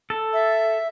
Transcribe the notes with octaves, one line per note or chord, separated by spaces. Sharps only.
A4
E5